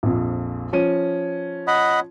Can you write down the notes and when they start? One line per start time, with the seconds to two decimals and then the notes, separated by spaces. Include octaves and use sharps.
0.03 A#1 F2
0.73 F3 C#4 D#7
1.67 D#5 F#5 B5